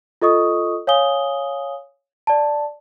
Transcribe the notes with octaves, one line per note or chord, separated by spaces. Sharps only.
F4 A4 D#5 C#6 D#6
C#5 F5 G#5 D#6 G7
D5 A5